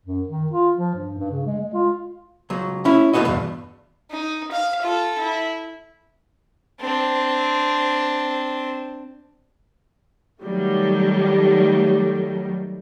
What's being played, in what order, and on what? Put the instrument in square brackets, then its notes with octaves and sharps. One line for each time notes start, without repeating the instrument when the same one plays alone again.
[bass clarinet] F#2
D#3
F4
F3
G2
G2
C#3
G#3
G#3
F4
[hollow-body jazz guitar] C#2 F#3
C#4 E4
D2 A2 B3 F#4 D#5
E2 G2 B2
[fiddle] D#4
F5
F4 A4
E4
[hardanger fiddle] C4 D4
[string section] D#3 F#3 G3 A3